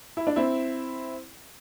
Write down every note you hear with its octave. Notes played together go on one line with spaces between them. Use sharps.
E4
D4
C4 E4